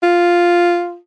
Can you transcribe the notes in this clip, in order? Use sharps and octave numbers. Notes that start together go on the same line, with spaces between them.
F4